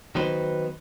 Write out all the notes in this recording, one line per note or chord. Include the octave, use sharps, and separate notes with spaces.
D#3 F#3 B3 D#4 B4 C5